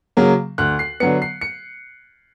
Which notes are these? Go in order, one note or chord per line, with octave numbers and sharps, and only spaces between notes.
C#3 F#3 A#3
D2 F#6
C7
D3 F#3 B3 C#7
C7
C#7